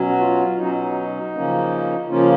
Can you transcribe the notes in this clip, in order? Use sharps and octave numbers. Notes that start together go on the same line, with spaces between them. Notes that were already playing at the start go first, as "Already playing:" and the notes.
Already playing: B2 F#3 C#4
F#4
F4
B2 F#3 C#4 D#4
D#4
C#3 F3 A#3 C#4
C#3 F3 A#3 C#4 F4